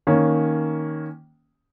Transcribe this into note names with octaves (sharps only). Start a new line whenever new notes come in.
D#3 A#3 C#4